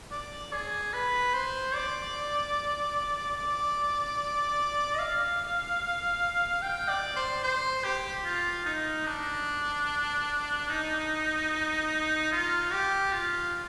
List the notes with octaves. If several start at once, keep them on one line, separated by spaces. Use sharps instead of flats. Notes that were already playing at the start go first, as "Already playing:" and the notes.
D5
G#4
B4
C5
D5
D5
D#5
F5
G5
D5
C5
C5
G4
F4
D#4
D4
D#4
F4
G4
F4